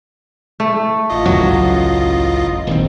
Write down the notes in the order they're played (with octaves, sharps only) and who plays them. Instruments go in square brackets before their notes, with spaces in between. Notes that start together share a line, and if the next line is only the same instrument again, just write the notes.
[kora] A3
[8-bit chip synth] A1 F4 D#5
[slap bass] C#2 F#2 [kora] F#3
[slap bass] D#1 D#2 C4